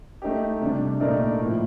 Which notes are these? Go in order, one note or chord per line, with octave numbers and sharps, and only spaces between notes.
A3 D#4 G4
C3 G3 D4
A#2 A3 D#4 A#4 D5
A2 F3 A#3